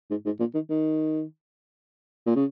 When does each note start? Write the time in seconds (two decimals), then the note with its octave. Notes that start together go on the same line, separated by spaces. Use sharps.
0.10 G#2
0.25 G#2
0.39 A#2
0.54 D#3
0.70 D#3
2.26 A#2
2.36 C#3